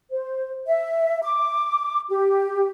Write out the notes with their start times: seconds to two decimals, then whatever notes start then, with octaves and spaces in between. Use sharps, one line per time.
0.11 C5
0.67 E5
1.23 D6
2.10 G4